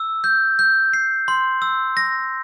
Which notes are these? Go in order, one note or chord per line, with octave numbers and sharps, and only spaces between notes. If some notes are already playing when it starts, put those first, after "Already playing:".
Already playing: E6
G6
G6
C7
C6
E6
A#6